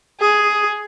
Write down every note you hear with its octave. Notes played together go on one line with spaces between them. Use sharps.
G#4